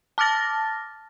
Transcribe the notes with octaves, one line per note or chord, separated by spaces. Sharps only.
A5 D6 F6 A6 A#6